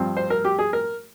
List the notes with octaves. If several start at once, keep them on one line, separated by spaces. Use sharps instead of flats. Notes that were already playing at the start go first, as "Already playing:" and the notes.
Already playing: G2 F3 C4
C5
A#4
G4
G#4
A#4